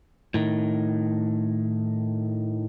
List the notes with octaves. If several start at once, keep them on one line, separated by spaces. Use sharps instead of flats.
A2 D#3